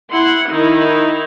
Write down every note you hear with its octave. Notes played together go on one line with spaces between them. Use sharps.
E4 F#5 C6
D#3 D#4 E4